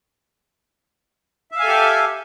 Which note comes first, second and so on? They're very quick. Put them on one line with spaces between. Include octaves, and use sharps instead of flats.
E5 F5 G#5 A4 G4